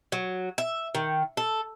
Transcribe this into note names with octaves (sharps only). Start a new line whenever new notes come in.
F#3
E5
D#3
A4